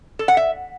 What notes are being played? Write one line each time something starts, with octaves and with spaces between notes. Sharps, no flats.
A4
F#5
E5